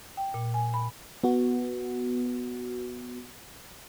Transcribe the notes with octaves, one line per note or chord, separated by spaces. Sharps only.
G5
A#2
G#5
B5
B3 F#4